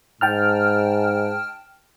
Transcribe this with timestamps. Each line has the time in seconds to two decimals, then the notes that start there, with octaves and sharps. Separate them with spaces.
0.21 G#2 G5 A5 F6